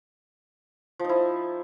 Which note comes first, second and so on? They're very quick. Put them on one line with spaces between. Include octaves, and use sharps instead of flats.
F3 D#4 E4